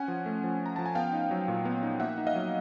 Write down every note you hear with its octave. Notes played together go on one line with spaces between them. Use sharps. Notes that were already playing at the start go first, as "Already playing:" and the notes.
Already playing: C#4 F#5 G#5
F3
A3
F3
C#4
A#5
F3 A5
G#5
B3 F5 G5
D#4
F#3
A#2
B3
D#4
A#3 E5 F#5
D#4
D#5 F5
F#3